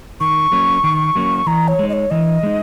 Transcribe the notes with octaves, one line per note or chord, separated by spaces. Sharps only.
D#3 C#6
F#3 A#3 C#4
D#3
F#3 A#3 C#4
E3 A#5
C#5
G#3 D#4
D#5
C#5
E3 D#5
G#3 D#4